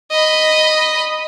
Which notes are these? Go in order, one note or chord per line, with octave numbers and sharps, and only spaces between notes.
D#5 B5